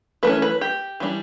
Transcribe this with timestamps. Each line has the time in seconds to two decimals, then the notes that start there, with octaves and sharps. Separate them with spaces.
0.23 E3 A3 C#4 B4
0.42 B4
0.61 G4
1.00 E3 G3 D4